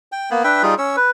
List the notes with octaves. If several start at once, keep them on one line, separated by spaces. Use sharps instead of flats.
G5
A#3 B3
D4 B4 E5 G5
G3 D#4 F4 G#4
C#4 C#5 E6
B4